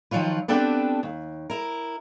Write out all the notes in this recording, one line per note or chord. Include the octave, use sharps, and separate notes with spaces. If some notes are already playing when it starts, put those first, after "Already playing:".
D#3 F3 F#3 F4 B4
B3 C4 D4 G4 A4 B4
D#2
E4 A#4